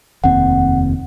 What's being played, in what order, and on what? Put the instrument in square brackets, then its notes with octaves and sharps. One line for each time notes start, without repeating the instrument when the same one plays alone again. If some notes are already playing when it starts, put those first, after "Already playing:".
[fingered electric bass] F1 D#2 C4 [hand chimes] F#5